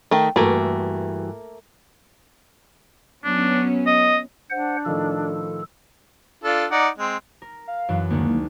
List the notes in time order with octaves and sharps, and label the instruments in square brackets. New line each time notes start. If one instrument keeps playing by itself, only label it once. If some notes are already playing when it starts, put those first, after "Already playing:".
[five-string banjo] D#3 A3
[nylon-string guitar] G2 E3 F#4 [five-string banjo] A3 A#3
[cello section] F#3 B3 C#4 [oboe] D4
[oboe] D#5
[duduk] D4 [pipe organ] C5 F#5
[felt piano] A2 D#3 F3 [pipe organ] A4
[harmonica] D4 F4 A4
D#4 D5 F#5
G#3 C4
[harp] A#4
[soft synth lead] F5
[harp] F#2 E3
[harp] D2 D#3 G#3 [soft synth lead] A#3